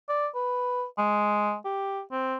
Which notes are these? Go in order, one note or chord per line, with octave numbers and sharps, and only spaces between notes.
D5
B4
G#3
G4
C4